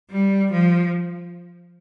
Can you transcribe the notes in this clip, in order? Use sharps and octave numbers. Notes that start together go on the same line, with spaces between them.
G3
F3